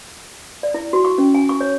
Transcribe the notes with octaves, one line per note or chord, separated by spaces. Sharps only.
D5
E4
F#4
C#6
C#4
G#5
C#6
C#5